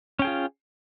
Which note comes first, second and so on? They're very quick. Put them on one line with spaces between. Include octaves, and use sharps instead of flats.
C#4 G5 G#4 F4